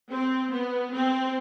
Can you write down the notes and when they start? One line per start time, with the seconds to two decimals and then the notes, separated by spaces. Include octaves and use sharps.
0.11 C4
0.52 B3
0.93 C4